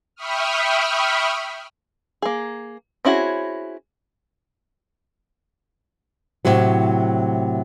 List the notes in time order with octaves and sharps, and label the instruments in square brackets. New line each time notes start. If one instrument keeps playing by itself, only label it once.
[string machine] E5 G5 B5 C#6 D#6 F6
[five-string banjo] A#3 G#4
C4 C#4 E4 F#4 G#4
[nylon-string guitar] A2 C3 F#3